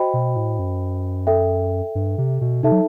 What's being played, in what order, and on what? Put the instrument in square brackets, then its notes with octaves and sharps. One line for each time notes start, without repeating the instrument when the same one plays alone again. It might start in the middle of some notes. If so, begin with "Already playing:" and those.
Already playing: [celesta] F#4 C5 D#5 G5 B5
[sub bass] B2
A2
F#2
[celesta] A4 E5 G5
[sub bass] G2
C3
B2
[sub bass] C3 [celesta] D#4 A4 E5 A5
[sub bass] F#3